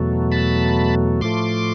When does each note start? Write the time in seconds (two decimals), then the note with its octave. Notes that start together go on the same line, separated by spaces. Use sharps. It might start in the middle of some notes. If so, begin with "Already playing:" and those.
Already playing: E2 B2 F#3 A3
0.32 A5 B5
1.21 A2 F3 A3 C6 D6